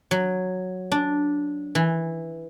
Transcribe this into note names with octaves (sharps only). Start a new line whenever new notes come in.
F#3
D4
E3